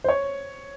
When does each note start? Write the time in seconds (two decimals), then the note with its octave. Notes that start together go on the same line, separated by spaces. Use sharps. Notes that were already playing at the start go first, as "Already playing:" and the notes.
0.04 C5
0.09 C#5